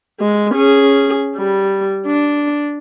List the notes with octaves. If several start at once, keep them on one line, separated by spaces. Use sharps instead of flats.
G#3
C#4 G#4
G3
D4